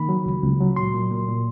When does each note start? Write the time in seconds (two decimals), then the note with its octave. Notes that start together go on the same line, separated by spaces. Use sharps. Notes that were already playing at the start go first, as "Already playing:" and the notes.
Already playing: D#3 A#3 B5
0.09 F#3
0.26 C#2
0.43 C#2
0.60 F#3
0.76 A#2 C6
0.94 A#2
1.11 A#3
1.28 A#2